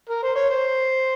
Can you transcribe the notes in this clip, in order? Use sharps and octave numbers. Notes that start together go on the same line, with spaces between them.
A#4
C5
C#5
C5